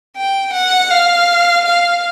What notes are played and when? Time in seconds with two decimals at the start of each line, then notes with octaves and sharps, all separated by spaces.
0.17 G5
0.53 F#5
0.90 F5
1.65 F5